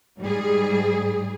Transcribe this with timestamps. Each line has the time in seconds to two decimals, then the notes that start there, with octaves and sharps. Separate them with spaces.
0.19 G#2 G3 G#4